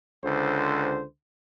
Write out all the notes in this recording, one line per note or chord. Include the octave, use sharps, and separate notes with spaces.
C#2 D3 C5